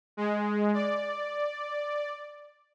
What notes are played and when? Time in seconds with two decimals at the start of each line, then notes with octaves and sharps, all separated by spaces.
0.17 G#3
0.74 D5